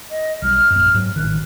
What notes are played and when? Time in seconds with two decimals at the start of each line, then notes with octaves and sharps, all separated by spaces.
0.10 D#5
0.42 B1 G3 F6
0.70 A#1 F#2
0.94 G#2 F#3
1.16 A1 D#3 F#6